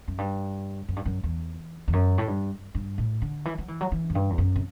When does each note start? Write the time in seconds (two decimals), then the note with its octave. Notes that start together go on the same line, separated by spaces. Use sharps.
0.08 F#2
0.18 G2
0.88 F#2
0.96 G2
1.05 F#2
1.23 E2
1.88 E2
1.93 F#2
2.18 A2
2.28 G2
2.75 G2
2.98 A2
3.22 D3
3.45 E3
3.58 F#3
3.68 E3
3.81 F#3
3.92 E3
4.10 F#2
4.15 G2
4.30 E2
4.38 F#2
4.56 C3